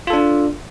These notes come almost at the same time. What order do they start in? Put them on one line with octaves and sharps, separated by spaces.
F4 A4 D4